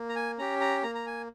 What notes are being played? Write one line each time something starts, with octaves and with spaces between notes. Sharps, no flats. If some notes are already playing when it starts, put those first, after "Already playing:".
Already playing: A#3
A#5
G#5
C#4 G4 A#5
A#5
A#3 A#5
A#5
G#5